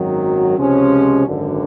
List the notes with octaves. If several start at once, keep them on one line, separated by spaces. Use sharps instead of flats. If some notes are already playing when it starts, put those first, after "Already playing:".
Already playing: G#1 F#2 D#3 F#3
C#2 C3 F3 G#3 C#4
G#1 F#2 D3